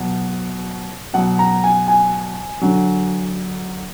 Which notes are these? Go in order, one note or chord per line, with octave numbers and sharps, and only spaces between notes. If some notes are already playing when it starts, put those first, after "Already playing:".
Already playing: B2 F#3
B2 F#3 F#5
A#5
G#5
G#5
D3 F#3